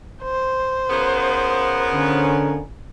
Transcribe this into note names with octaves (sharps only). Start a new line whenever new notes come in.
C5
C#3 F3 B3 A#4
D3 C#4